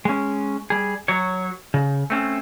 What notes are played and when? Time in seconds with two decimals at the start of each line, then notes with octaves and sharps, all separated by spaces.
0.05 G#3 C#4
0.70 G3 G#4
1.08 F#3 C#5
1.74 C#3
2.10 A3 C4 C#4